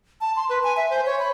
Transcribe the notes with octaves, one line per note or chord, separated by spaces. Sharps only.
A5
C6
B4
G#5
E5
C5
C#5
B5